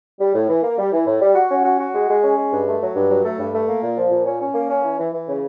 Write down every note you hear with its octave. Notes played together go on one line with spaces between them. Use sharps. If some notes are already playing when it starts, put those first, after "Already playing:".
G3
A2
E3
A#3
G3
E3
A2
G3
F#4
C#4
F#4
F#4
G#3
G#3
C#4
G#3
G2
A3
F#3
G2
F#3
A3
G2
A3
A#3
A#2
F3
A#2
C#4
C#4
A#3
C#4
E3
E3
E3
C#3